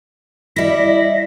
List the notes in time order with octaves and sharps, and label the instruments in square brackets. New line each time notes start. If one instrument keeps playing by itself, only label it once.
[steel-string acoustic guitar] G3 E4 [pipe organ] D#5 E5